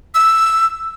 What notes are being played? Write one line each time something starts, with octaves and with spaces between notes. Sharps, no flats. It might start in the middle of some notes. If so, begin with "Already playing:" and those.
E6